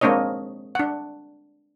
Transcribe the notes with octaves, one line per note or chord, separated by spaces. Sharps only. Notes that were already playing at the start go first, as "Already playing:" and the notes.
G#3 A#3 C4 D4 C#5 D#5
D4 F#5